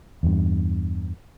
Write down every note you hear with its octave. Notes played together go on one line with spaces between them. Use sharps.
E2 G2